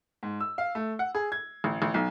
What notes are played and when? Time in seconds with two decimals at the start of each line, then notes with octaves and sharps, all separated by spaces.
0.23 G#2
0.40 E6
0.58 F5
0.75 A3
0.99 F#5
1.15 G#4
1.32 G#6
1.64 A1
1.82 A1
1.94 B1